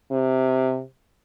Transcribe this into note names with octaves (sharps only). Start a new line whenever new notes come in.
C3